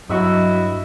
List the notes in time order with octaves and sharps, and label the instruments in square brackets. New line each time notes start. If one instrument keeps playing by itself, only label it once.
[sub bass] G2 [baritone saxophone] F#3 [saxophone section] E4 F#4 [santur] D#5 E5 C#6